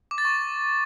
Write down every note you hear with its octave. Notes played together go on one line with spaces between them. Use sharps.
D6
A6
C#6